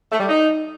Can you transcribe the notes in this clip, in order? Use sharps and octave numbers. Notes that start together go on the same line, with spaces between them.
A3
G3
D#4